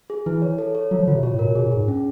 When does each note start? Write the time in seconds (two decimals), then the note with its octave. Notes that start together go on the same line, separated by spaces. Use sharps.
0.10 G#4
0.26 E3 E4
0.42 C#5
0.58 A4
0.75 C#5
0.91 F#3 F4
0.99 F3
1.07 D3 F4
1.15 C3
1.23 B2 C#5
1.34 A2
1.39 A#4
1.44 B2
1.55 B2 G#4
1.66 A#2
1.72 G#2 G#4
1.88 C#4